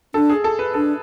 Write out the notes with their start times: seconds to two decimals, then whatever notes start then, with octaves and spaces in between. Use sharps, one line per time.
0.14 D4 A4
0.30 G#4
0.44 A4
0.59 B4
0.74 D4 A4